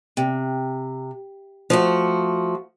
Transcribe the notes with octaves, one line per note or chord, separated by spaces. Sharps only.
C3
F3 A3 F#4